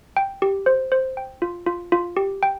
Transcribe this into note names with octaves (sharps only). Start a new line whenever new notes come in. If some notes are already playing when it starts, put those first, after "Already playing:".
G5
G4
C5
C5
G5
F4
F4
F4
G4
G5